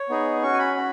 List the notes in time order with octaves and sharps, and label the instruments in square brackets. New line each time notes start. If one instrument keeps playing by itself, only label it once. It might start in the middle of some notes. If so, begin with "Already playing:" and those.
Already playing: [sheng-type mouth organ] C#5
B3 D#4 G#4
C#4 F#4 C#6
G#5
B5
C#4 F#4